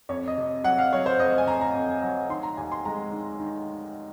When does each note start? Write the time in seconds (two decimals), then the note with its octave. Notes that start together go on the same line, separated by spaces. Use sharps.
0.09 F2 C#5
0.28 D#5
0.38 C3
0.64 F#3 F#5
0.78 F5
0.92 F#3 C#5
1.06 C5
1.19 F2 D#5
1.38 G#5
1.47 F2 A#5
1.61 A#5
1.75 F2
2.02 F#3
2.30 D#3 C6
2.43 A#5
2.57 D#2 G#5
2.72 C6
2.85 G#3 A#5
3.12 D#3
3.40 D#3